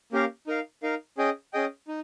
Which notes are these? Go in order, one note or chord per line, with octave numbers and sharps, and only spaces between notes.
A#3 C#4 G4 A#4 F5
D#4 A#4 F5
D#4 A#4 F5
C#4 G#4 D#5 G5
C#4 G#4 D#5 G5
D#4